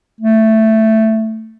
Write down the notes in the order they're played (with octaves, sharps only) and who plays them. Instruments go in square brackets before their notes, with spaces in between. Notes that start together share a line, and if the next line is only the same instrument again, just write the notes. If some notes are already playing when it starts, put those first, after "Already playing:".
[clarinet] A3